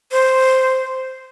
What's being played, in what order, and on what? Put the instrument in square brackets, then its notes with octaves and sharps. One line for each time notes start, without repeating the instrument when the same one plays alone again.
[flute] C5